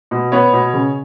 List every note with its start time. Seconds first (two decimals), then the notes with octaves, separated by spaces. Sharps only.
0.11 B2
0.32 B3 C#5
0.53 B2
0.73 C#3